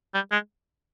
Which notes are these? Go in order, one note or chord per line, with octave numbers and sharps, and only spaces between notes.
G3
G#3